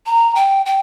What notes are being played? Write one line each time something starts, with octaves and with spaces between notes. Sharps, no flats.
A#5
G5
G5